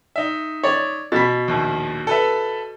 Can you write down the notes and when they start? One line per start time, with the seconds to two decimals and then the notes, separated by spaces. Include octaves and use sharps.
0.16 D#4 E5
0.63 C#5 D5
1.12 B2 B5 A6 B6
1.48 A#1 D#2
2.07 A4 B4 E5